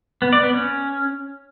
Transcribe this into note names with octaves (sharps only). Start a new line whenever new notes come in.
B3
D5
B3
C#4